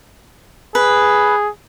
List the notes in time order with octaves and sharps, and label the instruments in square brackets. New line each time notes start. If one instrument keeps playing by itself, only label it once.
[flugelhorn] G#4 [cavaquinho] B4